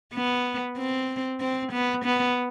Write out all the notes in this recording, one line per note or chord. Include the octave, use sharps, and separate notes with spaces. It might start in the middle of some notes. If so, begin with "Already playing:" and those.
B3
C4
C4
B3
B3